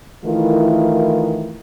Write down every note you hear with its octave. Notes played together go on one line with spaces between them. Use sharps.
D#3 E3 A3 E4 F4 A#4